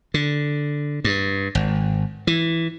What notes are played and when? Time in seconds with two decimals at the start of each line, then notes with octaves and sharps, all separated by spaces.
0.14 D3
1.04 G2
1.55 G#1
2.27 E3